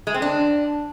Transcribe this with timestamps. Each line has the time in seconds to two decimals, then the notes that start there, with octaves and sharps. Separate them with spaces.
0.07 G#3
0.14 C4
0.22 D4